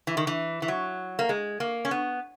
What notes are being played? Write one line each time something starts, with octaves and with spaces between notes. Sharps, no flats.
E3
D#3
E3
E3
F#3
A#3
G#3
A#3
C#4
B3